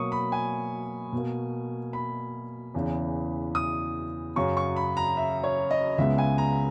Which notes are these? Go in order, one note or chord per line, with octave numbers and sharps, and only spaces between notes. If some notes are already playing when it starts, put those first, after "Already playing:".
Already playing: B2 F#3 A#3 C#6 D#6
B5
G#5
B2
A#3
B5
E2 C#3 E3
D#6
F#2 C#3 F#3 C#6
C#6
B5
A#5
E5
C#5
D#5
C#2 C#3 G#3 B3 E5
G#5
A#5